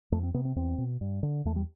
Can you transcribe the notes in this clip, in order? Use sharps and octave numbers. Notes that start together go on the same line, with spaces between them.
F2 A3
C4
C3 B3
C4
E2 C4
B2
G2
D3
E2 A3
G3